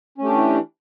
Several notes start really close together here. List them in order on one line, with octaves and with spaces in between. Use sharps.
C#4 A3 G4 D4 E3